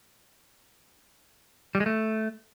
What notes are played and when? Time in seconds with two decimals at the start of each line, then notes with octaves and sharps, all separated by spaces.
1.75 G3
1.80 G#3
1.86 A3